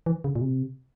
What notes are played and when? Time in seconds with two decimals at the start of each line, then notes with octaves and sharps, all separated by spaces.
0.06 E3
0.24 C#3
0.36 A#2
0.41 C3